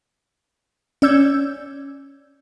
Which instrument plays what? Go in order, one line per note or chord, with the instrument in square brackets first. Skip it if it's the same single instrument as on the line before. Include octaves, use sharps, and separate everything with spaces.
[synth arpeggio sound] C#4 D5 E6 G6 G#6